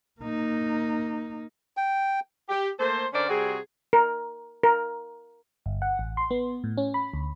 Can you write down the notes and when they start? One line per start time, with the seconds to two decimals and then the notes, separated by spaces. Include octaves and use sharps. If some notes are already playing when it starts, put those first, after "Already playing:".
0.21 A#3 D#4
1.77 G5
2.49 G4
2.79 A3 A#3 A4 C5
3.13 D3 C#4 D4 A#4 C5 D5
3.29 C3 G3 C4 F#4 G#4
3.93 A#4
4.63 A#4
5.66 G1
5.82 F#5
5.99 A1
6.17 C6
6.31 B3
6.64 A2
6.78 C#4
6.94 B5
7.13 D2